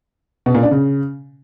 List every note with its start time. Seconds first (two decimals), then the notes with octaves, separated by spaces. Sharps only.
0.46 B2
0.54 A#2
0.63 D4
0.71 C#3